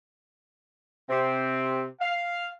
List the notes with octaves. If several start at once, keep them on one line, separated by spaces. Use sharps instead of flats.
C3 C4
F5